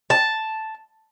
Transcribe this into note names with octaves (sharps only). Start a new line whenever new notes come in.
A5